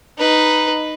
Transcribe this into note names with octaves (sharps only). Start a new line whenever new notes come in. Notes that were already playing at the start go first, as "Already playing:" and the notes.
D#4 B4